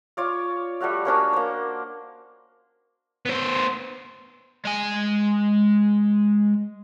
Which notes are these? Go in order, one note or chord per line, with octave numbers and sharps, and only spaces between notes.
F4 C#5 D5 F5
G3 A3 F#4 F5
A#3 C#4 D4 C#5
A#3 C5
B3 C5
G#3 G#5